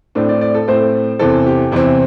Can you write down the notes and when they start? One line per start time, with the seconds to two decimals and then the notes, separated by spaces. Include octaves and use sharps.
0.15 A2 A3 C4 D4
0.29 D5
0.41 D5
0.55 A4
0.68 A2 A3 C4 C5
1.19 E2 C3 E3 C4 A4
1.47 G4
1.72 E2 C3 E3 C4 E4